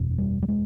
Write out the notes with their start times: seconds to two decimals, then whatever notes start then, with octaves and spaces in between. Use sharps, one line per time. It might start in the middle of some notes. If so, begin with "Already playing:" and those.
Already playing: F#1 E2 B2
0.18 G3
0.42 G3
0.48 G#3